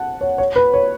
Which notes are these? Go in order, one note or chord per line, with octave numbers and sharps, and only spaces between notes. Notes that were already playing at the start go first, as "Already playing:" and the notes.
Already playing: F#5 A5
C#5
C#5
B4
C#5